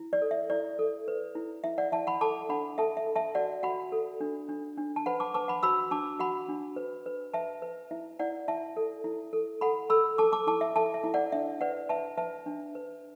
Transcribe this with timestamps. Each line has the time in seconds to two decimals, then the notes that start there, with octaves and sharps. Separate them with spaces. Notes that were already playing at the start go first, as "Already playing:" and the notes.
Already playing: E4
0.13 D5
0.22 A4
0.31 E5
0.50 E4 D5
0.79 A4
1.08 B4
1.35 E4
1.64 E4 E5
1.78 D5 F#5
1.92 E4 E5 A5
2.07 F#5 B5
2.21 A4 A5 D6
2.49 D4 F#5 B5
2.78 A4 E5 A5
2.97 E5
3.07 A4
3.16 E5 A5
3.35 F#4 D5 F#5
3.63 F#4 F#5 B5
3.92 A4
4.20 D4
4.49 D4
4.77 D4
4.96 A5
5.06 B4 F#5 B5
5.20 A5 D6
5.34 B4 A5 D6
5.48 F#5 B5
5.63 F#4 B5 E6
5.91 D4 A5 D6
6.20 F#4 F#5 B5
6.49 D4
6.76 B4
7.06 B4
7.34 B4 E5 A5
7.62 B4
7.91 E4 E5
8.19 E4 D5 F#5
8.48 E4 E5 A5
8.77 A4
9.04 E4
9.33 A4
9.61 A4 F#5 B5
9.90 A4 B5 E6
10.18 A4 A5 D6
10.32 A5 D6
10.47 E4 A5 D6
10.61 E5
10.76 A4 E5 A5
10.94 E5
11.04 E4
11.14 D5 F#5
11.32 D4 E5
11.61 B4 D5 F#5
11.89 B4 E5 A5
12.18 B4 E5 A5
12.46 D4
12.75 B4